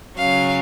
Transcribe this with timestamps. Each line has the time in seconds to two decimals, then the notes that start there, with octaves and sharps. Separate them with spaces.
0.17 C#3 F#3 C#4 F5